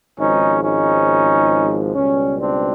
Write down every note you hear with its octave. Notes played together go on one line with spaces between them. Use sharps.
G#1 G#2 F3 C#4 D#4
C#4 D#4
C#2 B2 G3 C#4
C4 D4